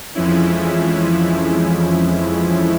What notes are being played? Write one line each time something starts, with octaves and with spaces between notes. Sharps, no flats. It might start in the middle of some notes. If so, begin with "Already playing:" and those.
F2 E3 F3 G#3 C#4 E4